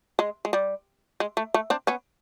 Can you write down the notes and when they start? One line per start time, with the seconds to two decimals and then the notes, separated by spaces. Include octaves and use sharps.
0.19 G#3
0.45 G#3
0.53 G3
1.20 G#3
1.37 A3
1.54 A3
1.70 C4 D4
1.87 B3 C#4